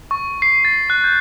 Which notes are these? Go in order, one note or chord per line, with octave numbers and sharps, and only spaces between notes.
C#6
C7
A6
F#6
G6